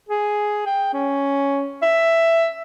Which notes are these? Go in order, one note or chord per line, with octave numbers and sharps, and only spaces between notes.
G#4
G5
C#4
E5